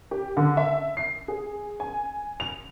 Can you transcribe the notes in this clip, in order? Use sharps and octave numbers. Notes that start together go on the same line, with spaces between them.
G4
D3
E5
C7
G#4
G#5
F7